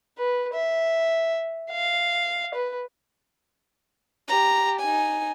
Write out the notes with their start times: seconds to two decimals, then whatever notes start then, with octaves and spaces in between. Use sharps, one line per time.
0.18 B4
0.54 E5
1.71 F5
2.54 B4
4.28 G4 A#5
4.80 D#4 G#5